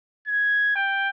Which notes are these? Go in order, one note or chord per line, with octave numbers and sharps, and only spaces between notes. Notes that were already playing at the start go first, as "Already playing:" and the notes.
G#6
G5